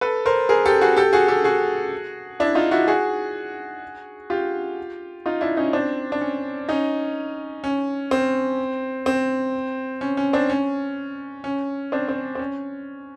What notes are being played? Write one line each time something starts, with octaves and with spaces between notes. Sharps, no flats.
A4 B4
A#4 C5
G#4 A#4
G4 A4
F#4 G#4
G4 A4
F#4 G#4
G4 A4
F#4 G#4
D4 E4
D#4 F4
E4 F#4
F#4 G#4
F4 G4
D#4 F4
D4 E4
C#4 D#4
C4 D4
D4
C#4
C#4 D#4
C#4
C4
C4
C#4
C#4
C4 D4
C#4
C#4
C4 D4
C4
C4
C#4